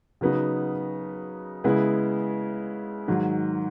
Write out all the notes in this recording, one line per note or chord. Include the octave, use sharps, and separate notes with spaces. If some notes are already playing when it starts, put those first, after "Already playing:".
C#3 F#3 B3 D#4
C#3 G#3 B3 E4
G#2 D#3 F#3